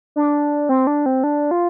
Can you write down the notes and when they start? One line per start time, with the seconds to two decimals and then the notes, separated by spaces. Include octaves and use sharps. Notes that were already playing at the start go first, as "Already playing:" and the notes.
0.16 D4
0.69 C4
0.87 D4
1.06 C4
1.24 D4
1.51 F4